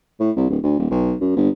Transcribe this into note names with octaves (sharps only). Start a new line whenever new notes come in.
A2
C2
D1
D2
D#1
B1
F#2
G1